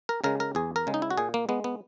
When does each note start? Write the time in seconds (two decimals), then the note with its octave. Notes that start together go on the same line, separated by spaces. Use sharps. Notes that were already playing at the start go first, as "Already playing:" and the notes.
0.09 A#4
0.24 C#3 G#3 A#4
0.40 A#4
0.55 E2 G#4
0.76 A#4
0.87 C#3 G#3
0.94 D#4
1.02 E4
1.11 F#4
1.18 A#2 G#4
1.34 A#3
1.49 G#3 B3
1.64 B3